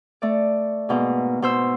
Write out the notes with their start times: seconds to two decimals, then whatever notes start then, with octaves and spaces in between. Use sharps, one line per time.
0.22 A3 D5
0.89 G#2 B2 A#3
1.42 B2 C5 E6